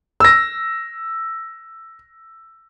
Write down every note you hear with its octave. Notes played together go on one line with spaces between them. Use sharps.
E6 A#6